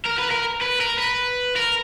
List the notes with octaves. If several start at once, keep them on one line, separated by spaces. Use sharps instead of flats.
A#4
B4
A#4
B4
A#4
B4
A#4